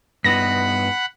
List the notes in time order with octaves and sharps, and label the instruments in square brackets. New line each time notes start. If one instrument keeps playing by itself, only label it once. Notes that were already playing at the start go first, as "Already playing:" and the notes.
[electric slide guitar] G2 B3 D#4 [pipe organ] F#5 B5 [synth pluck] A#6